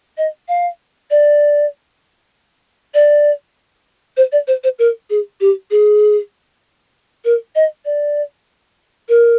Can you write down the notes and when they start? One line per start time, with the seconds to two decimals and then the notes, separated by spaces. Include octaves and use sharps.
0.17 D#5
0.48 F5
1.10 D5
2.94 D5
4.17 C5
4.32 D5
4.47 C5
4.64 C5
4.79 A#4
5.10 G#4
5.40 G4
5.71 G#4
7.25 A#4
7.55 D#5
7.85 D5
9.09 A#4